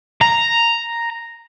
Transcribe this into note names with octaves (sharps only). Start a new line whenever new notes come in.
A#5